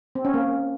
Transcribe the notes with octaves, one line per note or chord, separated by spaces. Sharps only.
C4
C#4
A#3